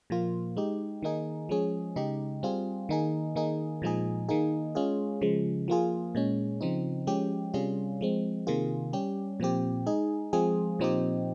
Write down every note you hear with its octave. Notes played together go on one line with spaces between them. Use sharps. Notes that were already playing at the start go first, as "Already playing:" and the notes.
A#2 F3 A#3 F4
G#3 D#4 G4
D#3 A#3 D#4 G#4
F3 G#3 C#4 G#4
C#3 G#3 D#4 G4
G3 C4 F4 G#4
D#3 A#3 D#4 G#4
D#3 A#3 D#4 G#4
A#2 F3 G#3 D#4 G#4
D#3 A#3 D#4 G#4
G#3 C#4 F4 G#4
C#3 F3 G#3
F3 A#3 F4 G#4
A#2 G#3 C#4
C#3 F3 C4 D#4
F3 G#3 C#4 G4
C3 G3 C#4 F4 G#4
F3 G#3 C4
C3 D#3 A#3 F4 G#4
G3 C#4 G4
A#2 F3 C4 G4
G#3 D#4 G#4
F3 G#3 C4 F4 G#4
A#2 F3 C4 D#4 G4